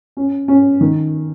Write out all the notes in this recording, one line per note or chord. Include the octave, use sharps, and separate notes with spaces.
C#4
C#4
D#3